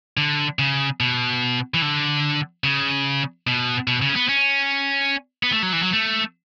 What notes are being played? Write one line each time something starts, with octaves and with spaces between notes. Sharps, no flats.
D3
C#3
B2
E3
D3
C#3
B2
B2
C#3
C#4
B3
C#4
B3
A3
F#3
E3
F#3
A3